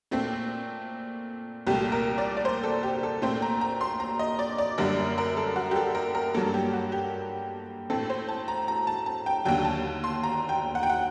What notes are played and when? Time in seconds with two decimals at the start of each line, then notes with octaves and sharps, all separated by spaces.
0.11 A#2 A3 C4
1.67 C2 A#2 A3 G4
1.92 A#4
2.18 D5
2.37 D5
2.45 C5
2.63 A4
2.83 G4
3.03 A4
3.22 A#2 A3 C4 C5
3.42 A#5
3.61 A#5
3.81 C6
4.00 A#5
4.19 D#5
4.39 D5
4.58 D5
4.78 F#2 D3 G3 A#3 A#4
5.18 A#4
5.37 A4
5.56 F#4
5.71 G4
5.76 A4
5.95 A#4
6.15 A#4
6.34 G2 F#3 A#3 A4
6.54 G4
6.73 F#4
6.92 G4
7.90 A2 A3 C4 A4
8.10 C5
8.28 A5
8.48 A#5
8.68 A#5
8.87 A5
9.06 A5
9.26 G5
9.45 D#2 D3 F#3 G5
9.65 A5
10.04 C6
10.23 A#5
10.49 G5
10.75 F#5
10.83 G5
10.90 F#5